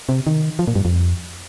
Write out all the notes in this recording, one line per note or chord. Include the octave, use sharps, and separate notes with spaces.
C3
D#3
F3
A#2
G2
F2